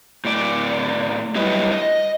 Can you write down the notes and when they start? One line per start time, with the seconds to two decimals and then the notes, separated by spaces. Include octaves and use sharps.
0.25 A2 D5
1.35 F#3 G3 E4 B4 D#5
1.71 D#5